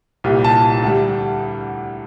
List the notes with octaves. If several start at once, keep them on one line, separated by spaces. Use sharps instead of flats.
C2 A#2 G3
A5
D2 D3 G3